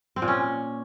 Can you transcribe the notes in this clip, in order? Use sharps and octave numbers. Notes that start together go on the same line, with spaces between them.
C4
A#2
C#4